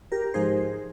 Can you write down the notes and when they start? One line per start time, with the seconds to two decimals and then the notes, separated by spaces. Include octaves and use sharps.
0.12 G4 A#4
0.34 G#2 F3 G#3 D#4 G#4 C5